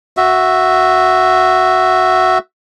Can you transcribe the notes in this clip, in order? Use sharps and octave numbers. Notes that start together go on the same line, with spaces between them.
F#4 E5